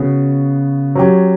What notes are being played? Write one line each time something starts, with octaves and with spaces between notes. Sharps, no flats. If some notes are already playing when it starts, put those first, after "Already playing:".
Already playing: C#3 B3 F#4
F#3 C#4 G4